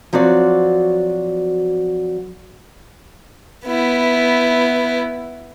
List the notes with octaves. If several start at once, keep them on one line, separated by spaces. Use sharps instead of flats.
F3 F#3 C4 F#4 D5
B3 E4